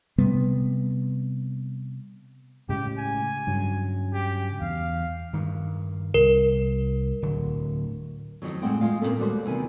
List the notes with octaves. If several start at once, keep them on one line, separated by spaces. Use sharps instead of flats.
C3 G3 B3
A2 C#3 G#3 G4
G#5
G2 C#3 F#3
G4
E2 F5
G2 D#3
C2 A#4
D1 D3 F#3
F2 B2 D#3 F#3
F2 A2 G#3 C4 F#5 G5
G#3 F4 F5
A#2 C#3 C4 C#4 A4
D#2 G3 F#4 C5
E2 C3 D#3 G#5